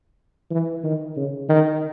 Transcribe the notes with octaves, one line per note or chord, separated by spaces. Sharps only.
E3
D#3
C#3
D#3